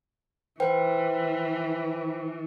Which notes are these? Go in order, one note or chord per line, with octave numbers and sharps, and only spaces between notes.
E3 B4 C5 G5